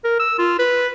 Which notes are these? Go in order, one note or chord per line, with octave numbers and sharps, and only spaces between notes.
A#4
E6
F4
B4